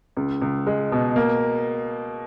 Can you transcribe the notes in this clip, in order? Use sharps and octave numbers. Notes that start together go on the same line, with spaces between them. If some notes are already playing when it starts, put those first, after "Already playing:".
C#2
C#2
G#3
B2
A#3